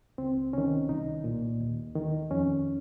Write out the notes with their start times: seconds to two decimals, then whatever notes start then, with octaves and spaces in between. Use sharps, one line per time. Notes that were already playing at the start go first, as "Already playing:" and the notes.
0.18 C#2 C4
0.53 C3 D#3 C#4
0.89 C2 D#4
1.24 A#2
1.60 D#2
1.95 D#3
2.31 F2 C#4